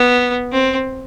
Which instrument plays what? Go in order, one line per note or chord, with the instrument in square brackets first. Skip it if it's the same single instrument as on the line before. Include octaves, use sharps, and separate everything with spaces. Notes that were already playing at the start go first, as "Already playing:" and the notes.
Already playing: [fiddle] B3
C4